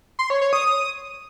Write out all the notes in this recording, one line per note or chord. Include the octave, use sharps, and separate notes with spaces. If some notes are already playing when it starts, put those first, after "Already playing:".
C6
C#5
C#5
D#6